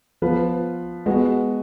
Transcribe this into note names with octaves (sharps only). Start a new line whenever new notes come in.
F3 B3 F4 B4
G#3 B3 F#4